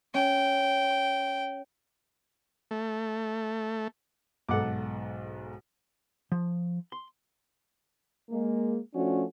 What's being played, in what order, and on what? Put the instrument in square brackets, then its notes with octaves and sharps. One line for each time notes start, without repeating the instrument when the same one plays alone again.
[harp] C#4 [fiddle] G5
[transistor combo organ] A3
[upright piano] B1 G#2 [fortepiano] A4 F#5 D6
[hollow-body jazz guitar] F3
C6
[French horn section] G#3 A#3
F3 A3 C#4 D4 F#4